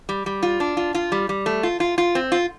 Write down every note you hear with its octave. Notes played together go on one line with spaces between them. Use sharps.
G3
G3
F4
D4
F4
F4
G3
G3
A3
F4
F4
F4
C4
F4